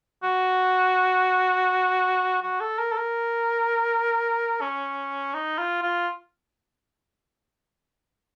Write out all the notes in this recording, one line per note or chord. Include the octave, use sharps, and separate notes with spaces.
F#4
F#4
A4
A#4
A4
A#4
C#4
D#4
F4
F4